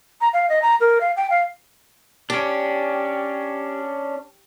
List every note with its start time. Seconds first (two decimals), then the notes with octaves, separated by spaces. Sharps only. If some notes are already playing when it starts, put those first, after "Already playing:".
0.21 A#5
0.33 F5
0.49 D#5
0.62 A#5
0.80 A#4
1.01 F5
1.16 G5
1.30 F5
2.30 C#4 D4 G4